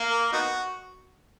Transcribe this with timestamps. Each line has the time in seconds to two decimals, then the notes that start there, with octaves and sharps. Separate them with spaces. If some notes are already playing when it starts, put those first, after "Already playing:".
Already playing: A#3
0.09 A#4
0.32 B3 D#4 F#4